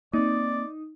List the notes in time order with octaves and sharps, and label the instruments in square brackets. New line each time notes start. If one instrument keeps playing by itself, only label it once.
[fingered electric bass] A#3 C4 [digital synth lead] D#4 [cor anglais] D5